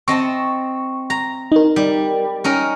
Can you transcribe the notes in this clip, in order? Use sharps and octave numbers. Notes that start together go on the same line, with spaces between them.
C4 D#5 A5 C#6
A#5
D#4 A#4
G3
C#4 D#4 A#4